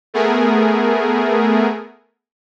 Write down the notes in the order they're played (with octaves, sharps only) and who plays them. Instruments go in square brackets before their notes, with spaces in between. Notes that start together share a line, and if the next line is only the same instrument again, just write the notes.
[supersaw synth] A3 B3 G#4 A#4